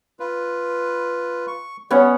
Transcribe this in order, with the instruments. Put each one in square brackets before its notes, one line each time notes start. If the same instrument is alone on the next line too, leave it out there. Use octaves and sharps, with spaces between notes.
[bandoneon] F4 B4
C#6
[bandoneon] G3 [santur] B3 C#4 F#5